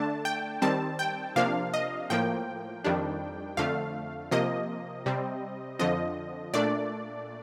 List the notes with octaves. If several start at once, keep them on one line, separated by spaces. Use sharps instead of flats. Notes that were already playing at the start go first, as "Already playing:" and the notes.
Already playing: D3 A3 D4 A5
G5
D#3 G3 C4 A5
G5
C3 F3 A#3 D4 F5
D#5
A2 F3 A#3 G5
F2 D#3 G3 D4
F2 D3 A3 F5
C3 F3 A#3 D#5
C3 G3 C4
F2 D3 F3 D#5
A#2 A3 D4 D5